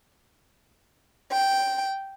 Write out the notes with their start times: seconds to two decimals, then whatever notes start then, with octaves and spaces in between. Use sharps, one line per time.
1.31 G5